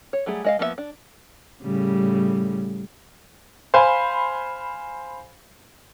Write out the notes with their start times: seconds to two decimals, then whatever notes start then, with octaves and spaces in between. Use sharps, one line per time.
0.13 C#5
0.26 F#3 G3 A3 G#4
0.44 G#3 D#5 F5
0.59 F3 A#3 B3 F4 E5
0.78 D4
1.63 A2 C#3 G3
3.74 C5 F5 G#5 B5